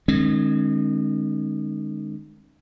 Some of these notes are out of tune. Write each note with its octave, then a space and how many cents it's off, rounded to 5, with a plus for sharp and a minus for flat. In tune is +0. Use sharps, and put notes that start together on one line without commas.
D#3 -40 G#3 +0 C4 +45